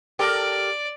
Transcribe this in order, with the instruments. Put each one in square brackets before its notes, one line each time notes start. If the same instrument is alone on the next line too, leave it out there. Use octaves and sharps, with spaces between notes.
[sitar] G4 A4 A#4 [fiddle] D5